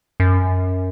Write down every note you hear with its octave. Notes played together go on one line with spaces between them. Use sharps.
F#2